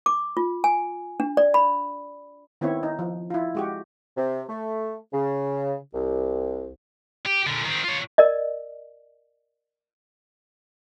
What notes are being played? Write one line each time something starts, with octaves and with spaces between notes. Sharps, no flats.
D6
F4
G#5
D4
D5
B5
D#3 B3 C4 E4 C#5
D#4
F3
E4 F4
G#3 F#4 G4
C3
A3
C#3
C2
G4
A#2 D3
D#3 C4
F4 C#5
A#4 D5 D#5